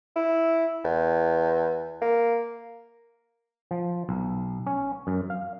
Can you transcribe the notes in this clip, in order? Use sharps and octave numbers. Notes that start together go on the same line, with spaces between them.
E4
E2
A#3
F3
B1
C#4
F#2
F5